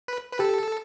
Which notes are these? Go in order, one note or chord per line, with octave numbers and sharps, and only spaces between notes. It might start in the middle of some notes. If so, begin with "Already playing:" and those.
B4
B4
G4 A4